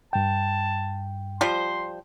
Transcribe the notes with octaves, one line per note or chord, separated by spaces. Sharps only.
G2 G5 A5
F3 G3 C5 C6